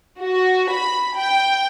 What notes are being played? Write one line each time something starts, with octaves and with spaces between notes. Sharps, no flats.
F#4
B5
G5